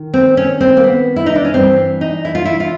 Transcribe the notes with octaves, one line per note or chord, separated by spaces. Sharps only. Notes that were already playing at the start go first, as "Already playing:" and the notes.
Already playing: D#3
C4
C#4
C4
A#3
B3
E4
D#4
D4
C#4
G2 E3 C4
D#4
E4
F4
E4
F4